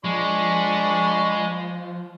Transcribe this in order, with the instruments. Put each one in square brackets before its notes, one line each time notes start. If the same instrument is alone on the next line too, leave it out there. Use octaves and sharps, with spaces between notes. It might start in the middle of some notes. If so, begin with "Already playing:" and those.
[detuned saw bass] F3 [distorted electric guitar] G#3 [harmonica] D4 B5 C#6